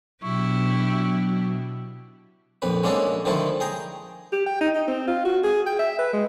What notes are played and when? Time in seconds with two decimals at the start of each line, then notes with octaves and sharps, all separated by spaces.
0.23 B2 F#3 D4 E4 G4 C#6
2.62 A#1 F2 B4
2.84 G#3 A#3 C#4 D4 F#4 A4
3.25 D3 D#3 F3 A3 E4 A4
3.60 G#4 G5 A#5
4.32 G4
4.46 G5
4.61 D#4
4.75 D#4
4.88 C4
5.07 F4
5.25 F#4
5.44 G#4
5.67 G5
5.79 E5
5.98 B4
6.13 G#3